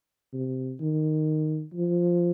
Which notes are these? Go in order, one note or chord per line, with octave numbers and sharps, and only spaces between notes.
C3
D#3
F3